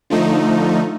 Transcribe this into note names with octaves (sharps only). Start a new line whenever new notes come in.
D3 F3 A3 D#4